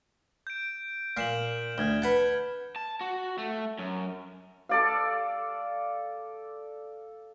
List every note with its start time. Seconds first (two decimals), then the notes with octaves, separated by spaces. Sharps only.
0.47 G6 D7
1.17 A#2 F5 F6 E7 F#7
1.78 D2 F6 G#6 G7
2.02 B4 F#5 A5
2.76 A5
3.01 F#4
3.38 A3
3.79 F#2
4.69 A4 D5 F5